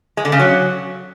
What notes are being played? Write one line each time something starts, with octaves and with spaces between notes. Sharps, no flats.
G#3
D3
C#3
F#3